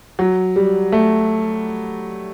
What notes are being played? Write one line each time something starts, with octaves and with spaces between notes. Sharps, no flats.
F#3
G3
A3